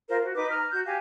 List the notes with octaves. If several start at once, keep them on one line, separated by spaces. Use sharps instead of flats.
F4 A#4 C5
F#4
D#4 B4 D6
A#5 F6
F#4 G6
G4 F5 G#5